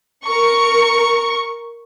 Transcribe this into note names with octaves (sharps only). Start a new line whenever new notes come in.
A#4 C#6